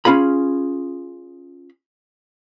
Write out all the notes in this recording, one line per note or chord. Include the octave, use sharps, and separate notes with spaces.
C#4 F4 G#4 B5